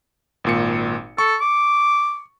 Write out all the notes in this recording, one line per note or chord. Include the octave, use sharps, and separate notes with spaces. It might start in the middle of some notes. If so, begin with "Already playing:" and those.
G#1 A#2 C#7
A4 C#6
D6